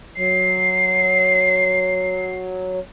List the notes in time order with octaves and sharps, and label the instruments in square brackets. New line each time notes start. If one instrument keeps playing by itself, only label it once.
[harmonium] F#3 [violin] C7